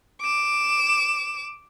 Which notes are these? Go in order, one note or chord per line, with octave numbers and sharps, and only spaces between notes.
D6 E7